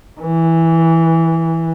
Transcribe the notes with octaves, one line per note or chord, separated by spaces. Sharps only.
E3